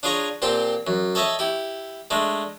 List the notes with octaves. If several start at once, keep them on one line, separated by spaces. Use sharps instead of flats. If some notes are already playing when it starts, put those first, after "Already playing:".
D4 F4 G#4 C#5 A#5 C#6
A#2 C4 G4 A5
F#2
A4 C#5 D#5 E5 A5
E4 G4
G#3 A3 D4